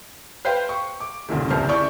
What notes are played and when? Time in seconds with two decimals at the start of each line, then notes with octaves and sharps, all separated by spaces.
0.45 B4 C5 F5 G5
0.69 C#6
1.00 D6
1.29 D#1 C2 A#2 C#3
1.50 F1 C#2 C3 C5 A5 F6
1.68 C#3 E4 D5 E5 C#6 G6